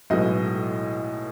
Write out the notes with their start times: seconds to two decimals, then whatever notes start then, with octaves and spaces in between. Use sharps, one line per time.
0.10 B1 A2 G#3 B3 D#5